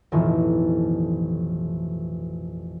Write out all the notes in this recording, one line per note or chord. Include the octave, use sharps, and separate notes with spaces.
A1 F2 B2 D#3 E3